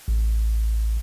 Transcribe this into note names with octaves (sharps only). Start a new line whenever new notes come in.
A1